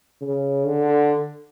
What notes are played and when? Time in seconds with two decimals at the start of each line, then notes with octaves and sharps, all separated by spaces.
0.21 C#3
0.66 D3